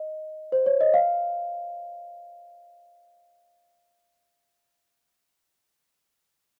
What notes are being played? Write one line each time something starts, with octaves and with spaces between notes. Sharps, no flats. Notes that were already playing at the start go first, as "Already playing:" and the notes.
Already playing: D#5
C5
C#5
D#5
F5